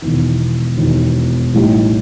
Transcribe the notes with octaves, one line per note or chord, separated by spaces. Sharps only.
E1 E2 D#3
E1 E2 D#3
A1 A2 G3 D#4